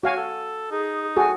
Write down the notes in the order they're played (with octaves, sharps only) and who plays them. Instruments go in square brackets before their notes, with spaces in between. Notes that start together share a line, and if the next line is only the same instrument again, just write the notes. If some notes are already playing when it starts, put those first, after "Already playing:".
[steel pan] F#4 F5 G#5 [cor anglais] C#5
[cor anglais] A4
[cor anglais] D#4 [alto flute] G#4
[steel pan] F#4 G#4 A4 [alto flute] G#5